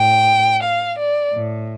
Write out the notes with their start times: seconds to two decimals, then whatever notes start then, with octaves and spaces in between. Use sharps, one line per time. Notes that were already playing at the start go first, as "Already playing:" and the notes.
Already playing: A2 G5
0.62 F5
0.97 D5
1.32 A2